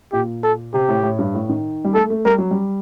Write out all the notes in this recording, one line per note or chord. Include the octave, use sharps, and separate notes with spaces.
A#2 G4
A4
C3 G4
A2
A2
G2
A2
D#3
G3
A3 A4
A3
G3 A#4
F#3
G3